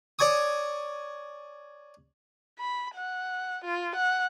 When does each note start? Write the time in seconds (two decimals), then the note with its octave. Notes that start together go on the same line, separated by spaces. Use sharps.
0.19 C#5 D5 G#5 C#6 D#6
2.59 B5
2.95 F#5
3.65 F4
3.96 F#5